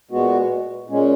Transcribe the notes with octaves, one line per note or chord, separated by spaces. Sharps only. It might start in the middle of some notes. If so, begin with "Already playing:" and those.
A#2 G#3 B3 F#4
A#2 G#3 C#4